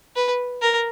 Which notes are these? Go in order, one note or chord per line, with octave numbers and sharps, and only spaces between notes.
B4
A#4